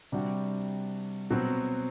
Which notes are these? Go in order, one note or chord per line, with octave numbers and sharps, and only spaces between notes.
C3 G3 D4 F#4
B2 F#3 C4